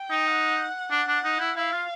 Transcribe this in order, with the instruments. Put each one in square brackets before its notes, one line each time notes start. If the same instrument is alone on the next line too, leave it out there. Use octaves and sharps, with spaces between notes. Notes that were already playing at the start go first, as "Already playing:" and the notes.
Already playing: [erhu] G5
[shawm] D#4
[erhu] F#5
[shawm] D4 [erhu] F#5
[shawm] D4
D#4
E4
[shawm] E4 [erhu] F5
[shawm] F4